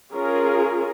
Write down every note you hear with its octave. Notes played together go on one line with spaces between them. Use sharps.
C#4 F4 G#4 A#4